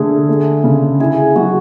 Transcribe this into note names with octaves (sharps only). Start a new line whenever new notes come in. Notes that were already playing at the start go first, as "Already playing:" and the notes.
Already playing: D3 A3 G#4
A3
C#3
E4 G#4
F#3 F#4